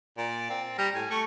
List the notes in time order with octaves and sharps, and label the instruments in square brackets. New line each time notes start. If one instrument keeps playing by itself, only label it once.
[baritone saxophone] A#2 [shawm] D5
[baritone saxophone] C4
[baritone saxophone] G3 [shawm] A#5
[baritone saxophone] A2 [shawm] G#5
[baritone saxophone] A3 [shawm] C#6